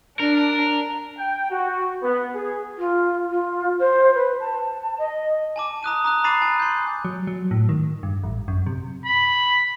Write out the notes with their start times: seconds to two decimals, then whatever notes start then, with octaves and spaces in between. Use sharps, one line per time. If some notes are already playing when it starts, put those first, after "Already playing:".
0.19 D4 A#4
1.17 G5
1.51 F#4
2.01 B3
2.34 G#4
2.78 F4
3.30 F4
3.79 C5
4.15 B4
4.40 A5
4.99 D#5
5.56 G#5 A5 D6
5.83 A#5 D#6 F#6 D#7
6.05 A#5 D#6 F#6
6.24 A#5 B5 D6 A6 C7 D#7
6.42 G#5
6.60 C6 G6
7.05 F#3
7.27 F#3
7.51 A2
7.69 D#3
8.03 G2
8.23 A1
8.48 F#2
8.66 C3
9.06 B5